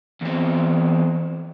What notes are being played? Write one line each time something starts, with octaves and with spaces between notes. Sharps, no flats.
E2 C4